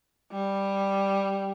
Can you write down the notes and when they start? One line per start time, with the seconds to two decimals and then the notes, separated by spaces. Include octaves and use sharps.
0.32 G3